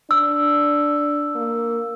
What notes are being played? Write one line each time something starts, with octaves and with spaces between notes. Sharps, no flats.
D4 E6
A#3